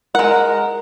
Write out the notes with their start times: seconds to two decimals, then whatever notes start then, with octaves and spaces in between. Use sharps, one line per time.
0.15 G#3 A#4 F#5